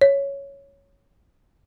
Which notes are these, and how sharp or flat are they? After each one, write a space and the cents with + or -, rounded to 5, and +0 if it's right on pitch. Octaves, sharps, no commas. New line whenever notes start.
C#5 +5